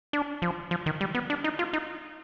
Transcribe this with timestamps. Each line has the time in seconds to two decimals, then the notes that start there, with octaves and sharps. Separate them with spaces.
0.13 D4
0.42 F3
0.71 F3
0.86 D#3
1.01 G3
1.15 B3
1.30 D4
1.44 D#4
1.59 F4
1.73 D#4